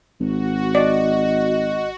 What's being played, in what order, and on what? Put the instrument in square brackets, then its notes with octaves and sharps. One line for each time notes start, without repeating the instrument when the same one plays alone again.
[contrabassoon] G#1 [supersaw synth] F#4
[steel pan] D5 [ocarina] D#5